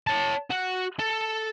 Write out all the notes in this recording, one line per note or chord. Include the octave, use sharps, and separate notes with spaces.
C#5 A5
F#4
A4